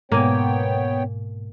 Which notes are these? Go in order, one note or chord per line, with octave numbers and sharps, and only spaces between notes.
G#2 B2 A#3 B3 C#5 G5 G#5